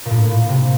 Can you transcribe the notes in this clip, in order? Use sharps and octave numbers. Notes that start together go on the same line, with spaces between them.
A#2
A2
A#2
C3